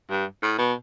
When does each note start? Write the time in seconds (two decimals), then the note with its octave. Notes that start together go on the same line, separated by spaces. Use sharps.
0.10 G2
0.43 A2
0.58 B2